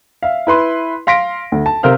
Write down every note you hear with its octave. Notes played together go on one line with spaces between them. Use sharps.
E5 F5
E4 B4 C6
F5 C6 A#6 B6 D7
D2
A5
C3 A#4 C5 F5 F6